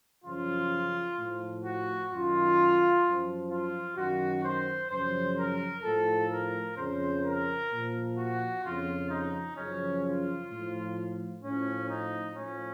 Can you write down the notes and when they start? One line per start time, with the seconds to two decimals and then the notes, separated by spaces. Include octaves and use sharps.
0.25 F#2 C#3 F3 F4
1.18 A2 F3
1.64 F#4
2.11 F#2 D#3 F4
3.05 F#2 F3
3.51 F4
3.97 F#2 D#3 F#4
4.44 C5
4.91 F#2 C#3 F3 C5
5.38 A#4
5.84 A2 F3 A4
6.31 A#4
6.77 F2 C#3 F3 C5
7.24 A#4
7.71 A#2 F3
8.18 F#4
8.64 F2 C#3 F3 F4
9.10 D#4
9.57 F#2 C#3 F3 C#4
10.04 F4
10.51 A2 F3
11.43 A2 F3 C#4
11.90 D#4
12.36 A2 F3 C#4